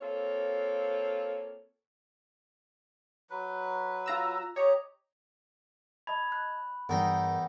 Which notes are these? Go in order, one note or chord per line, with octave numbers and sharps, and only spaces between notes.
A#3 C4 F4 A4 C#5
F#3 B4
F4 A#5 E6
G4 C#5 D#5 A#5
D#5 A5 B5 G#6
F#6
E2 G2 D#4 A#4 F#5 G5 A#6